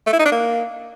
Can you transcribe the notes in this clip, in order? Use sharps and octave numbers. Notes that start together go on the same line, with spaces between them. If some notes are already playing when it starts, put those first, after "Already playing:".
A3
E4
D#4
D4
A#3